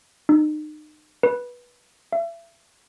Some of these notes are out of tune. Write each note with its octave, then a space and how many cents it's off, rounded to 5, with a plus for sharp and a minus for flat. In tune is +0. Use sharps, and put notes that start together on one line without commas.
D#4 -35
B4 -15
E5 +35